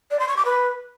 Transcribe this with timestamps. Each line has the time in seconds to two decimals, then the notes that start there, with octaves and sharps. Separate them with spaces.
0.11 D5
0.19 C6
0.28 C#6
0.37 D6
0.45 B4